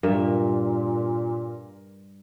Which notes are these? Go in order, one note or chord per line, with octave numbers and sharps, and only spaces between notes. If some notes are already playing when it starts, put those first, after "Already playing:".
G2 A#2 A#4 E5